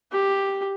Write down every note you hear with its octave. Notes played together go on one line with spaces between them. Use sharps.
G4